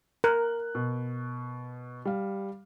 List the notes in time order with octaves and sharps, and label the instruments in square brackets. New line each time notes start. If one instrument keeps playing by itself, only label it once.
[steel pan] A#4 [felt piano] F#6
[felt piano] B2
G3 F5